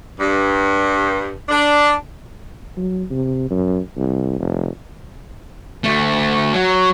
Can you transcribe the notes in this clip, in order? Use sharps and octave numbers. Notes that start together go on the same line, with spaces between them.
G2
D4
F#3
C3
F#2
C2
F1
D2 A3
F#3